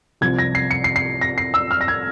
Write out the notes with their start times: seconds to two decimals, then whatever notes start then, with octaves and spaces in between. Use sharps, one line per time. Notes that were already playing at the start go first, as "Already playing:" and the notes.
0.21 C2 C3 F3 G#6
0.39 A#6
0.55 C7
0.71 C#7
0.84 C7
0.96 C7
1.21 A#6
1.38 C7
1.54 E6
1.71 F6
1.81 A#6
1.88 G#6